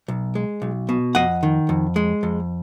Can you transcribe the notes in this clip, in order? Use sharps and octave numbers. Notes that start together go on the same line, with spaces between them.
B1
G#3
B1
B2
F2 D#5 F#5
D#3
F2
G#3
F2